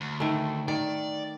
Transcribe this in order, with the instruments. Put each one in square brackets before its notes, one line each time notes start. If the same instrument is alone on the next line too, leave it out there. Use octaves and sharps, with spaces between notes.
[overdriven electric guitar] D2
[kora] D#3 A3
[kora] D#3 [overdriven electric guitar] D5